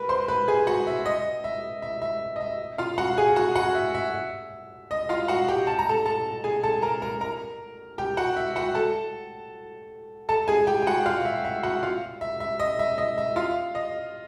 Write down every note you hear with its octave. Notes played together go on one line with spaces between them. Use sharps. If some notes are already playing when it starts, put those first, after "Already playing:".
Already playing: A#4 B4 B5
C5 C6
B4 B5
G#4 G#5
F#4 F#5
E5
D#5
E5
E5
E5
D#5
E5
F4 F5
F#4 F#5
G#4 G#5
F#4 F#5
F#4 F#5
E5
E5
D#5
F4 F5
F#4 F#5
G4 G5
A5
A#5
A4 A5
A4 A5
G#4 G#5
A4 A5
A#4 A#5
A#4 A#5
A#4 A#5
G4 G5
F#4 F#5
E5
F#4 F#5
A4 A5
A4 A5
G#4 G#5
G4 G5
G5
F#4 F#5
F4 F5
E5
E5
F#4 F#5
F4 F5
E5
E5
D#5
E5
D#5
E5
F4 F5
D#5